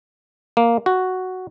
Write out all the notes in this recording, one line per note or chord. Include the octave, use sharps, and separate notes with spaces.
A#3
F#4